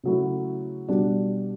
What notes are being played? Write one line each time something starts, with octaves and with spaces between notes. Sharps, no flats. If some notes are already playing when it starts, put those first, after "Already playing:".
C#3 F#3 A3 E4
B2 G3 D4 F#4